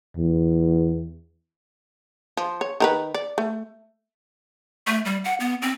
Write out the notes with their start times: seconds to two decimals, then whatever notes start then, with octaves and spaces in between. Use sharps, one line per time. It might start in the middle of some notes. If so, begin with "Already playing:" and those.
0.17 E2
2.37 F3
2.61 C#5
2.80 D#3 A#4 B4
3.14 D5
3.38 A3
4.87 A3
5.05 G3
5.24 F#5
5.40 B3
5.62 C4